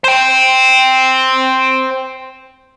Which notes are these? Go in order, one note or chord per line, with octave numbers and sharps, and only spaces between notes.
C5 G5